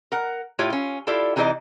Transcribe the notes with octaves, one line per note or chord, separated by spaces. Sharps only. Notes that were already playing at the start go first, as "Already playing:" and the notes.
A#4 F#5
A2 F4 G4 C#5
C#4 F4
E4 F4 G4 A4 D5
C3 E3 D#4 G#4 D5 D#5